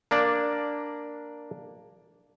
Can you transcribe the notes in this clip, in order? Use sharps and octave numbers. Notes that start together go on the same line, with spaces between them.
A#3 D4 D5